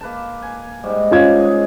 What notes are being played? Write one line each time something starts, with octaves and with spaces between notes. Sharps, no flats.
A#3 B4 A5
G#5
G#2 G3
C#4 F4 G#6
G#3 D#5